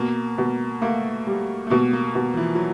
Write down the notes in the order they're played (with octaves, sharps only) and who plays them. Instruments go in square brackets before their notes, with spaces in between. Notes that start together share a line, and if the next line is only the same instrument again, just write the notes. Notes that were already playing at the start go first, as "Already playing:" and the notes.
Already playing: [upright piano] B2 [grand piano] A#3
[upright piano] B2
[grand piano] A3 [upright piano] A#3
[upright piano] G3
[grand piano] A3
[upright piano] B2 [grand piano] A#3
[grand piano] A#3
[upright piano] B2
[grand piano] F3
E3
F#3